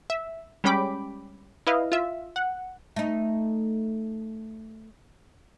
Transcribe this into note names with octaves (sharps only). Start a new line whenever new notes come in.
E5
G3 G#3 C#4 G5 B5 D6
E4 B4 D#5 F5
F4 E5
F#5
A3 D#4